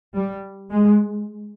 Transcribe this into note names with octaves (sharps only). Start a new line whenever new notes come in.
G3
G#3